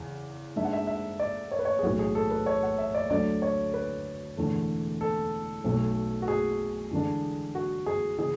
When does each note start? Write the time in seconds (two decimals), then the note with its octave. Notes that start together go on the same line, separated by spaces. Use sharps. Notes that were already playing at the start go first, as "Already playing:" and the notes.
Already playing: E2 C#3 E3
0.56 G#2 G#3 D4 E5
0.65 F#5
0.73 E5
0.87 E5
1.19 D5
1.52 C#5
1.59 B4
1.65 C#5
1.79 G#4
1.83 B1 A2 E3 F#4
1.99 G#4
2.15 A4
2.31 B4
2.46 C#5
2.63 F#5
2.78 E5
2.95 D5
3.10 D2 D3 F#3 A3 D5
3.42 C#5
3.74 B4
4.37 E1 E2 D3 A3
5.01 A4
5.64 B1 B2 A3
6.22 F#4
6.28 G#4
6.91 E2 D3 G#3 D4
7.55 F#4
7.86 G#4
8.18 C#3 E3 G#4